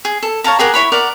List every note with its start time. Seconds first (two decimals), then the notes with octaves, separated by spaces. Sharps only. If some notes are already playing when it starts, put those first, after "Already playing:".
0.05 G#4
0.23 A4
0.44 C#5 F5 A5 A#5
0.59 G4 G#4 A#4 F#5
0.74 E4 C#5 B5
0.92 A#4 D5 F#5